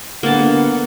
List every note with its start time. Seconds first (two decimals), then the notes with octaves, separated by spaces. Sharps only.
0.23 D3 G3 A#3 B3 F#5 A5